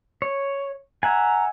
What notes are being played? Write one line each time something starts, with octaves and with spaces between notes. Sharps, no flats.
C#5
E5 F#5 G#5 A#5